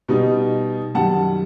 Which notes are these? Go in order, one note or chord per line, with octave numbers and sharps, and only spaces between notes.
B2 G3 D#4
F#2 D#3 G3 F#5 A5